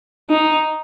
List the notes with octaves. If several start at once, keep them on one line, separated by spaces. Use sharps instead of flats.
D#4